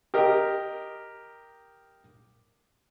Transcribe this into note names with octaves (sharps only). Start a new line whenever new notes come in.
G4 A#4 D#5